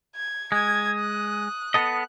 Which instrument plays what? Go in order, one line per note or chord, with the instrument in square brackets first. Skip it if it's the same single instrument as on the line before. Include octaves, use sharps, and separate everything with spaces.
[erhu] G#6
[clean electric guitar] G#3 [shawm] D#6 [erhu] G#6
[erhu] F#6
[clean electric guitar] B3 A4 D#5